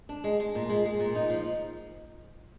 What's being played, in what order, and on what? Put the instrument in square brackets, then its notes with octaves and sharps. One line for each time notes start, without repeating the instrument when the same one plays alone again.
[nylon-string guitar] D4
G#3
G#3
A#2
G#3
G#3
A#2
D#4
F3